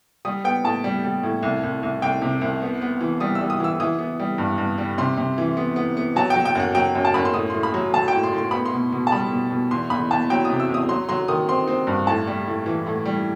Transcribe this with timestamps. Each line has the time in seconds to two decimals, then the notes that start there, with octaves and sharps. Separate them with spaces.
0.25 G3 D#6
0.44 B3 G5
0.64 A2 A5
0.84 G3
1.04 G3
1.23 A2
1.43 C2
1.63 C2
1.83 C2
2.02 C2 G5
2.22 C3
2.41 C2
2.62 B3
2.82 B3
3.01 E3
3.20 G3 D#6
3.35 E6
3.41 G3
3.50 D#6
3.60 E3 E6
3.80 E3 D#6
3.99 B3
4.20 G3
4.38 G2
4.58 G2
4.78 G3
4.98 C3 C6
5.17 C3
5.38 E3
5.57 B3
5.76 B3
5.97 B3
6.16 F#3 A5
6.30 G5
6.36 F#3
6.45 G5
6.55 F#2 F#5
6.75 F#3 G5
6.95 F#2
7.05 A5
7.14 F#2 B5
7.25 C6
7.34 A2 D#6
7.50 A2 C6
7.63 B5
7.74 F#3
7.94 F#3 A5
8.08 G5
8.13 A2
8.23 C6
8.33 A2
8.38 C6
8.51 B3 B5
8.66 C6
8.73 B2
8.93 B2
9.07 A5
9.12 G3 B5
9.32 B2
9.51 B2
9.71 E2 C6
9.90 E2 B5
10.11 E2 A5
10.30 F#3 G5
10.45 C3 D#6
10.60 E6
10.69 E2 D#6
10.88 F#3 C6
11.09 F#3 C6
11.28 D#3 D#6
11.48 C4 C6
11.68 C4
11.87 G2
12.07 A2 A5
12.27 G3
12.47 A2
12.66 E3
12.87 A2
13.06 G3